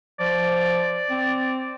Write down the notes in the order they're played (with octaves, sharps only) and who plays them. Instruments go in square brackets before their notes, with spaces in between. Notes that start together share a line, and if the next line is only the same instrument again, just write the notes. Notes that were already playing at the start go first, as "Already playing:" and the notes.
[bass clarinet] F3 [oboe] D5
[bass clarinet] C4